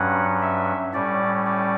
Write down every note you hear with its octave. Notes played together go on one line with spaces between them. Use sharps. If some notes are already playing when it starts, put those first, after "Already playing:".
Already playing: G2 F#3 C#4 F#5
E5
A2 G3 C#4 D5
D5